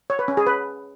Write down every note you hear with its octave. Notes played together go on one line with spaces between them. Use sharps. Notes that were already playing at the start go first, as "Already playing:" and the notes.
C#5
B4
C#4
G#4
B4